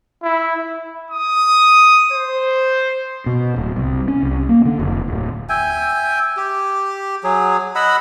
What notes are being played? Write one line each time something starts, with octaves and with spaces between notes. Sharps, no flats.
E4
D#6
C5
B2
D1
C2
C#4
C2
A#3
D3
F1
D1
E5 G5 G#5
G4
F#3 G#4
D#5 F#5 B5 E6